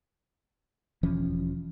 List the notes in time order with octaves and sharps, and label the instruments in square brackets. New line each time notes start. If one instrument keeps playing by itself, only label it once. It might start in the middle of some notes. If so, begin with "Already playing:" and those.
[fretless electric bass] E1 E3 F3 C#4